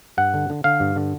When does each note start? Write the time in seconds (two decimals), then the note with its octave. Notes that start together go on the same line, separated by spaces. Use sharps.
0.17 G2 F#5
0.34 D3
0.50 D3
0.64 D3 F5
0.80 G2
0.96 D3